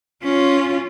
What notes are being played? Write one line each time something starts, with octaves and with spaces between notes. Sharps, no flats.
C#4 F4